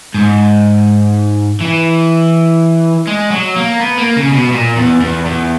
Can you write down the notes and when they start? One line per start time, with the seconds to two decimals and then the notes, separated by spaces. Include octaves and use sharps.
0.14 G#2
1.61 E3
3.07 G#3
3.30 F#3
3.56 A#3
3.80 B3
3.97 A#3
4.17 C#3
4.34 B2
4.53 A#2
4.77 E2
5.01 E2
5.26 E2